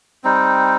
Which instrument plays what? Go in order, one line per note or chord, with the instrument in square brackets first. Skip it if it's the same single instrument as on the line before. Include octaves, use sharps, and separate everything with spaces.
[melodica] G3 C4 D#4